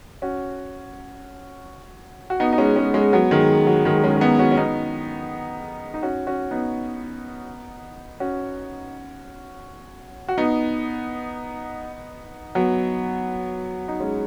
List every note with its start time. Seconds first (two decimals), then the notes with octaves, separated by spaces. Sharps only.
0.22 C#4 F#4
2.30 F#4
2.40 B3 D#4
2.53 D#4
2.58 G#3 C#4
2.76 G#3 C#4
2.94 G#3 C#4
3.13 F#3 B3
3.31 D#3 G#3
3.67 F#3
3.85 D#3 G#3
4.04 G#3 C#4
4.17 C#4
4.21 B3 D#4
4.39 C#4 F#4
4.52 C#4
4.57 B3 D#4
5.94 D#4
6.03 C#4 F#4
6.27 C#4 F#4
6.51 B3 D#4
8.20 C#4 F#4
10.28 F#4
10.38 B3 D#4
12.55 F#3 B3
13.88 D#4
14.00 G#3 C#4